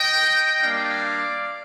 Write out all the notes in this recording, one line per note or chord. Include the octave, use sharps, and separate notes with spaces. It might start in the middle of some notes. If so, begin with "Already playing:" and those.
Already playing: D#5 G5
G3 A#3 D4 D5 F5